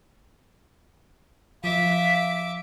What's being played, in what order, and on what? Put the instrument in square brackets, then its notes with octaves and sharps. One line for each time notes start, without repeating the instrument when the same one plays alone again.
[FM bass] F3 [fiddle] E5 D6 [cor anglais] F5 [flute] B6